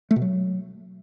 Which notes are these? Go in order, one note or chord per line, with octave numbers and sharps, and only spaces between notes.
A3
B2
F#3